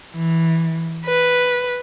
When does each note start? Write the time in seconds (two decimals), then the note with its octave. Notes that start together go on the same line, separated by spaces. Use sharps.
0.14 E3
1.04 B4